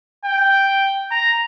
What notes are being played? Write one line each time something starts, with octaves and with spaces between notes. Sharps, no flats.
G5
A#5